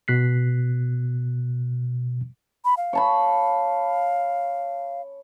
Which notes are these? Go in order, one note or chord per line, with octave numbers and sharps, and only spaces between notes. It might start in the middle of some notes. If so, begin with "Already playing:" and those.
B2 F#6 B6 C7
B5
F5
C#5 A5 B5